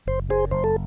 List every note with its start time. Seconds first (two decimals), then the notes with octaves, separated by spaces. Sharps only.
0.07 F#1 C5
0.29 F#2 G#4 C5
0.51 F#1 C5
0.64 A4